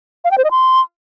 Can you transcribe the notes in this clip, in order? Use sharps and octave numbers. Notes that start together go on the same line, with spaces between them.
F5
G5
C5
D#5
C6